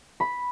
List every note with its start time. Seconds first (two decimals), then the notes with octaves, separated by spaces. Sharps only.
0.20 B5